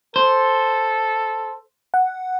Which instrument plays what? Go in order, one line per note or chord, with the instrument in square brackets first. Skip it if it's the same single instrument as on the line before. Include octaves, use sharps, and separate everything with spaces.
[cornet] A4 [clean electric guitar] C5
[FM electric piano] F#5